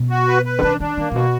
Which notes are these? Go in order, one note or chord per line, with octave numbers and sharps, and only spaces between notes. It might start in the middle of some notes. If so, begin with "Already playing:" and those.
Already playing: B2
F#4
B4
B4
D3
D#3 D4
D#3 D4
D#3 A#3
A#2
B2 F#4